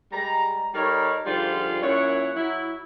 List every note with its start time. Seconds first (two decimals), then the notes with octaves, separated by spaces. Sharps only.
0.12 G3 G#3 A#5
0.74 G3 D#4 A4 A#4 C#5
1.25 G#2 D3 F3 G3 F4
1.82 F#2 A#2 E4 C#5 F#5
2.35 F#3 E4